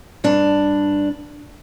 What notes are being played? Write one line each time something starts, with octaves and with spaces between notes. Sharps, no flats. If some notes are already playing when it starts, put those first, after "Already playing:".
G2 D4